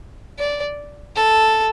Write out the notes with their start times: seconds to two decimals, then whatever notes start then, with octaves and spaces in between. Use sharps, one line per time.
0.39 D5
1.16 A4